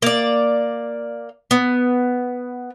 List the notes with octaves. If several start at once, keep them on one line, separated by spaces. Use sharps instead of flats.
A#3 D5
B3